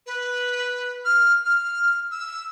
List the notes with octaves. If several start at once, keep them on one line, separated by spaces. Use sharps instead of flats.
B4
F6
F6
E6